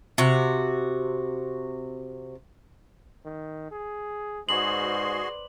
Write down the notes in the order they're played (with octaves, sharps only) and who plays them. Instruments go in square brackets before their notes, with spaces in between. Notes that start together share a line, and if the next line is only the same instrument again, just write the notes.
[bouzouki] C3 F#4
[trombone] D#3
G#4
[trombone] G#2 [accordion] F#4 G#4 C6 [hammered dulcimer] B4 C5 D5 [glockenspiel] F#7